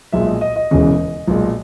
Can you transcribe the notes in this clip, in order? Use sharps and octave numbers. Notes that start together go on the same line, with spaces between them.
B1 A#2 G#3 E5
D#5
D#5
D#5
E1 E2 C#3 E3
B1 A#2 G#3